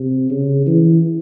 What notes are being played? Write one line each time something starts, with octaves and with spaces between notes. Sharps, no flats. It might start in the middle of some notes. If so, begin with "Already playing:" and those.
Already playing: C3
C#3
E3